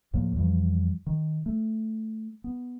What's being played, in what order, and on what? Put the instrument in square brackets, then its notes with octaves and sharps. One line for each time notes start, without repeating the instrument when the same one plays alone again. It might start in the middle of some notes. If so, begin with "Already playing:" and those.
[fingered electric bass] D2 A2 F3 A#3
F2 E3 F3 G3
D#3
A3
B3